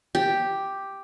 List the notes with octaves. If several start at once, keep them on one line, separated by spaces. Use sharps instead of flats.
G4